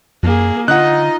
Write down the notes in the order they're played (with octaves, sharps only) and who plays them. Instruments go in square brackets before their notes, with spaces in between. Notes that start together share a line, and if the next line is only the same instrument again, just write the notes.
[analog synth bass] F#2 [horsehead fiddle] A#3 G#4
[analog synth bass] D3 [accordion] D#4 D#5 [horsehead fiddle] F4 [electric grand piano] F#5 F#6